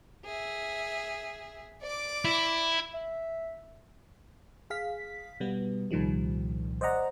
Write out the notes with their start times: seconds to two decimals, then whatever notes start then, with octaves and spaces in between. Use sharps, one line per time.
0.25 G#4 E5
1.82 D5 D6
2.25 E4
2.94 E5
4.70 G#4 F5 B6
5.40 B2 G3 B3
5.91 C2 A#2 D#3 F3 G3
6.81 C5 D5 D#5 F#5 A#5